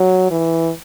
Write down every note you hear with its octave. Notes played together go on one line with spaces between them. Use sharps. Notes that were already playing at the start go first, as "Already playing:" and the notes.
Already playing: F#3
E3